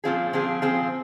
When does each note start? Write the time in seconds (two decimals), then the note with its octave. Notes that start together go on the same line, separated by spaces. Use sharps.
0.04 A#2 F3 C4 F4 G#4
0.33 A#2 F3 C4 F4 G#4
0.62 F3 C4 F4 G#4